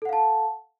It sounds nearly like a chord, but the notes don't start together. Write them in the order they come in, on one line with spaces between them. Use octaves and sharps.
A4 F#5 F5 A5